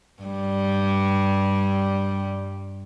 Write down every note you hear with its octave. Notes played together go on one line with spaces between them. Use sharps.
G2 G3